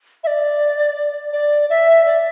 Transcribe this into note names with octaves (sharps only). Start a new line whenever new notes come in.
E5
D5
D5
E5
D5